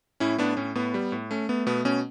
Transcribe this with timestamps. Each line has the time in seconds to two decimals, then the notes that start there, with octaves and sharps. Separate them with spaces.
0.20 A2 C#4 E4
0.38 A2 B3 D4
0.57 A2 C#4
0.75 A2 B3
0.94 G3
1.12 A2
1.31 A3 C#4
1.49 A3 B3
1.66 B2 B3
1.85 B2 C#4